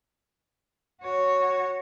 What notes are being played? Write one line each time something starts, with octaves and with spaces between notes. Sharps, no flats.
F#4 C#5